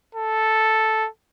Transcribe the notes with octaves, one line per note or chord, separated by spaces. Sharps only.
A4